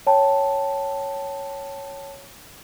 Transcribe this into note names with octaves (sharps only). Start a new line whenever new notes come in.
C#5 G5 A5